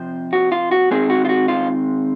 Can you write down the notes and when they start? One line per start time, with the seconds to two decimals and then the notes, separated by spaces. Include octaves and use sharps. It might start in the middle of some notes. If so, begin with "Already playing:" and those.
Already playing: C3 F3 C4
0.33 F#4
0.52 F4
0.71 F#4
0.91 D#3 G#3 C4 D#4 G#4
1.10 F#4
1.25 F4
1.29 F#4
1.48 F4